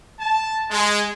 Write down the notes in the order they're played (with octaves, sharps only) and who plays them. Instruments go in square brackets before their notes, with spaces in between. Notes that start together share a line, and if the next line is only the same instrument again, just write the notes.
[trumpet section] A5
G#3